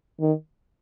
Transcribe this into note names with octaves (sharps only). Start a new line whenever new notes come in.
D#3